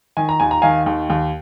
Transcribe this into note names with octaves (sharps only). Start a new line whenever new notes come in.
D#3 G#5
A#5
D#2 G#5
A#5
D#3 F5 G#5
D#2
D#2